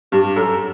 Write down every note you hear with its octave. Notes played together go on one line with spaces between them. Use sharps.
G2 G4
F#2 A4